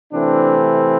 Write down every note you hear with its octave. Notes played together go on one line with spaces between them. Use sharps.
C3 E3 A3 C4 D4